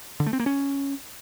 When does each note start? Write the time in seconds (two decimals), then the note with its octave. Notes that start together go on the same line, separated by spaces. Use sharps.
0.20 D3
0.26 A3
0.33 C4
0.40 A#3
0.46 C#4